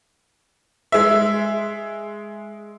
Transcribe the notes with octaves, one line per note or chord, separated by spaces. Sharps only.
G#3 E5